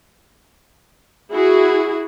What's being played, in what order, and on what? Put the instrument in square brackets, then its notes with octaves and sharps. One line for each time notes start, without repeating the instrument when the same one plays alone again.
[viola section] E4 F#4 G#4